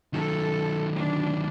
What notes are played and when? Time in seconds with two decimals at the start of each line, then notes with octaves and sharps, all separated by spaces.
0.13 D#3 F#3 A4
0.95 D2 D4